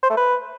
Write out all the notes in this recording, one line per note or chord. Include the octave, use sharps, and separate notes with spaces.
C5
A3
B4